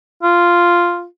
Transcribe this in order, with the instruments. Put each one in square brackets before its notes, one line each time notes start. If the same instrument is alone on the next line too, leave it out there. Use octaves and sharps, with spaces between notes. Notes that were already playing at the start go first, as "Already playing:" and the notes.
[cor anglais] F4